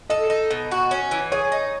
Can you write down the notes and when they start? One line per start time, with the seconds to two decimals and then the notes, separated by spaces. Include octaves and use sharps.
0.10 A4 D#5
0.30 D#4
0.50 B2
0.71 F#4
0.91 C#4
1.11 E3
1.32 G#4 C#5
1.52 D#4